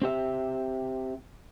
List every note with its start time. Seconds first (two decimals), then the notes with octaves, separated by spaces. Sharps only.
0.02 C4 G4 E5